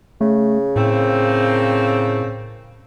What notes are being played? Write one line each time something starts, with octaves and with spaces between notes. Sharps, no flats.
C#3 A3
A2 A3 A#3 C4